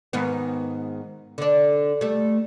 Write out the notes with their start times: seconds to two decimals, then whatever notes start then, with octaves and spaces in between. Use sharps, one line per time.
0.13 G#2 D#3 B3
1.38 D3 D4
2.01 G3 A3